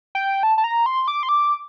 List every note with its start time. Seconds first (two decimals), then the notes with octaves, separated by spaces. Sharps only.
0.15 G5
0.43 A5
0.58 A5
0.64 A#5
0.86 C6
1.08 D6
1.23 C6
1.29 D6